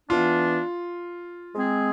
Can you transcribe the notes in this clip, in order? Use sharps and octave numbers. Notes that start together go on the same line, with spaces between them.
E3 B3 D4 F4
G#3 C4 G#4